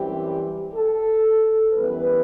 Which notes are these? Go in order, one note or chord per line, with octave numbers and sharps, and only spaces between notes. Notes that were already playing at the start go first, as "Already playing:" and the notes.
Already playing: F#2 E3 G3 C4 G4
A4
F#2 E3 G3 B3 B4